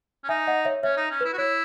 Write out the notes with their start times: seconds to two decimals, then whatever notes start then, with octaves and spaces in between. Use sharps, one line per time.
0.24 C#4
0.29 D#4 E5 G#5
0.47 D#5 F#5
0.65 C#5 E5
0.83 C#4 C#5 E5
0.97 D#4
1.11 C#4
1.21 E4 B4
1.33 F#4
1.38 E4 C#5